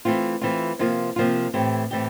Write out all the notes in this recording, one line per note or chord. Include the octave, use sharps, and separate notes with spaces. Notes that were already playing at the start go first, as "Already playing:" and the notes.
E3 A3 C4 F4
E3 A3 C4 F4
C3 F3 A#3 F4
C3 F3 A#3 F4
A2 E3 A3 C4 G4
A2 E3 A3 C4 G4